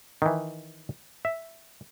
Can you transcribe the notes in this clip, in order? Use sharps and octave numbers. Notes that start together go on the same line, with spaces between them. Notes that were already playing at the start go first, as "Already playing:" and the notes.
D#3 E3
E5